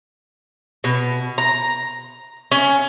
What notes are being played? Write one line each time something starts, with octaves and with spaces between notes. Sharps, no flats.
B2
A#5
C#4